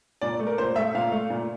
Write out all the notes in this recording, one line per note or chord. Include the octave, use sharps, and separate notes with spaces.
A#2 D5
A3
A#4
A#2 C5
A3 E5
A#2 F5
A3
A#2